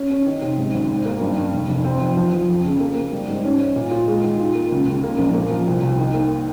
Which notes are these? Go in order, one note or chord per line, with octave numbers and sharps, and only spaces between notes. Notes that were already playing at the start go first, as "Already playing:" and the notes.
Already playing: C#4
C#4
D#3
C3
G#2
G#1
G#2
A#3
G2
G2
F1
F1
C4
F3
F3
F3
F2
C#3
A#3
A#3
G3
G#2
C#4
C#4
A#2
F4
G#3
D#3
F4
A#3
C#2
C#2
A#3
A#1
A#3
F3
C2
C2
D#3
A#3